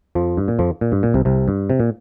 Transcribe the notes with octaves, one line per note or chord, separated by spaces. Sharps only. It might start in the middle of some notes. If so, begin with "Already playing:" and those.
F2 F3
G2
A#2
F2 F3
A#2
G2
A#2
C2 C3
C2 C3
G2
C3
A#2